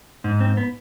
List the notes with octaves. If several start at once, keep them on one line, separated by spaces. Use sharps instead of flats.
G#2
C4
B3